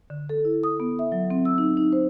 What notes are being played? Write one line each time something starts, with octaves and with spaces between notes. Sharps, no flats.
D3
A4
E4
D#6
B3
E5
F#3
C4
E6
D#4
D#4
C5